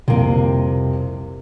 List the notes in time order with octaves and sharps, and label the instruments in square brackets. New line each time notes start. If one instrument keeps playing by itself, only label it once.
[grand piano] C2 F2 [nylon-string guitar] C3 A#3